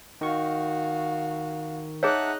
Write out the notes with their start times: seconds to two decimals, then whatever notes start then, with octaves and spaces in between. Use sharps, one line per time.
0.21 D#3 F#4 F5 C#6
2.03 D#4 G#4 C#5 E5 F#5 A5 F#6